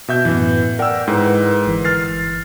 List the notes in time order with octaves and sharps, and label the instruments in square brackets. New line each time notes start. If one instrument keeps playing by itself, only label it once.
[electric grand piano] B2 E5 G6
[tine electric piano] F#2 A2 B3 [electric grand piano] E3
[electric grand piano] A#4 E6 [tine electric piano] D5 F#5 G5
[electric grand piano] G#2 [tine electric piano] E4 A#4 B4
[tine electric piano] G1 E3
[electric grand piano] F6 A6 C7